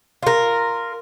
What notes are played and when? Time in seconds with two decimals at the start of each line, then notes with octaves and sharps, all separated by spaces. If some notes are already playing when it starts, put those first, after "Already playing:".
0.23 F4 A#4